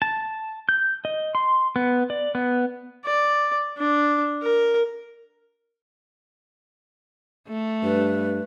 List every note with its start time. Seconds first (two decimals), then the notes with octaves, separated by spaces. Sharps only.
0.02 A5
0.69 G6
1.05 D#5
1.35 C6
1.76 B3
2.10 D5
2.35 B3
3.05 D5
3.77 D4
4.42 A#4
7.48 A3
7.83 G2 B4